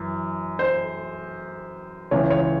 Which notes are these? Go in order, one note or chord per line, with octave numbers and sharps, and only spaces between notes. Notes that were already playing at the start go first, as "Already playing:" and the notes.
Already playing: F#2 E3
C5
C#2 C#3 E3 C#5
C#5